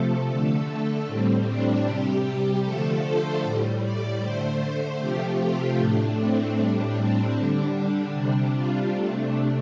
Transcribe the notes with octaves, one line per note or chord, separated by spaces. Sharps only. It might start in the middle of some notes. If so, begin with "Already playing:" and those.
Already playing: C3 F3 A3 A4
D3 A3 A4
A2 G3 C4
D4
C3 G3 G4
D3 F3 A3 A4
C5
A2 G3
D5
D3 A3 C5
C3 F3 A3 G4
F4
A2 A3 D4
C4
A2 G3 D4
C4
D3 G3 D4
C3 G3 D4
F4
C3 A3 D4